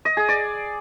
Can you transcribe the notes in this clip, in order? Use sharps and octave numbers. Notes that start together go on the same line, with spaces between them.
D#5
G#4
D5